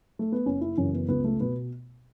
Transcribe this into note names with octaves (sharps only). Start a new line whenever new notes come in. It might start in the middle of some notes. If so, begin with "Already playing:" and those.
A3
B3
F#1 C#4
E4
F#2 C#3 E3 C#4
B3
C#2 B3
A3
B2 B3